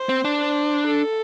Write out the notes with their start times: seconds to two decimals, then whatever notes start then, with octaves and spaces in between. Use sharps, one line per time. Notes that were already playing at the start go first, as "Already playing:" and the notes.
Already playing: C5
0.09 C4
0.25 D4
0.40 C5
0.87 A4